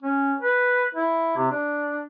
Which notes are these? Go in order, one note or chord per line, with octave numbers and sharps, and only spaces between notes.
C#4
B4
E4
C3
D4